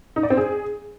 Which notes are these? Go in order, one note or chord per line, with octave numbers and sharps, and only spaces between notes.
D#4
D5
C4
G#4